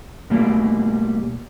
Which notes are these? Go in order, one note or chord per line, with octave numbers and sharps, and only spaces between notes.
B2 G3 A3 A#3